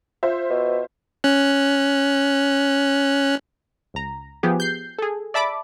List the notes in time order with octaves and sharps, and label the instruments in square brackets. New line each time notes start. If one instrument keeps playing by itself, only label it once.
[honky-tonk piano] F4 C5 E5
[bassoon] B2
[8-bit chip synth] C#4 F#6
[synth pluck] C#2 A#5
F3 B3 G4 G#4
G6 C7
G#4 A4
D5 E5 A5 B5 D6